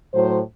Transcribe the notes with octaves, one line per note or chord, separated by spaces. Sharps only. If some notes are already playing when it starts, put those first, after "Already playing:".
A2 F#3 C5